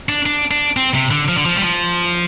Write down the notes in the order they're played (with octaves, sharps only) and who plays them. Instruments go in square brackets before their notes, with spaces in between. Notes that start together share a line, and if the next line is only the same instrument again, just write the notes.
[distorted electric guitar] D4
D4
D4
C4
C3
D3
F3
D3
F3
G3
F3